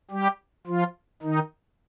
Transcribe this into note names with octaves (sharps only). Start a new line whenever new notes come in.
G3 G4
F3 F4
D#3 D#4